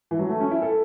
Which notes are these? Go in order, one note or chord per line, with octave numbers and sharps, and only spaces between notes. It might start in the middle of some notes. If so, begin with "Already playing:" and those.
E3
F#3
A3
C#4
E4
A4